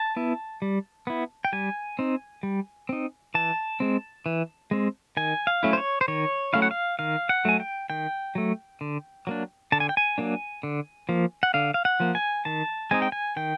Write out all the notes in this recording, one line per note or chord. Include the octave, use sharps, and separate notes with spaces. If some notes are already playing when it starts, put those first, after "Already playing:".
Already playing: A5
B3 E4
G3
B3 E4
G5
G3 G#5
C4 D#4
G3
C4 D#4
E3 A5
G#3 C4
E3
G#3 C4
D#3 G#5
F5
F#3 A3 C#4 E4
C5
C#5
C5
D#3 C#5
F#3 A3 C#4 E4 F5
F#5
F5
D#3 F5
F#5
F#3 A3 G#5
G5
D#3 G5
F#3 A3
D3
F#3 A#3 D4
D3 A5
G#5
G5
G#5
F#3 A#3 D4
D3
F3 A#3
F#5
D3 F5
F5
F#5
F3 A#3
G#5
D#3 A5
G#3 C4 D#4 G#5
G5
G#5
D#3 G5